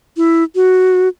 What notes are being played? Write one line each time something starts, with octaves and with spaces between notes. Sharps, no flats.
E4
F#4